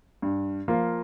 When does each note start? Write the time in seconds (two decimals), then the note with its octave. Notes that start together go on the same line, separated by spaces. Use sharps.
0.22 G2
0.68 F3 A#3 F4